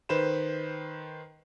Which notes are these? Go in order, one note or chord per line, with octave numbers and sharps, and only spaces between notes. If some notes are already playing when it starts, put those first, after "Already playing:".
D#3 B4 C5 B5 E7